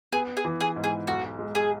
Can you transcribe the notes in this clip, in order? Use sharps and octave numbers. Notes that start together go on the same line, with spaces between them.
B3 G#4
G#4
E3
G#4
G#2
G#4
B1 F#4
G#3
G#4